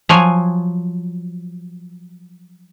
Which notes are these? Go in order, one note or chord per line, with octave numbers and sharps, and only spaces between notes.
F3 F#3 G#5